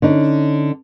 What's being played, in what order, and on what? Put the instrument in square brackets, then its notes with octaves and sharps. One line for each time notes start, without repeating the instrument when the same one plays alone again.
[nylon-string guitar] D3 C#4 D#4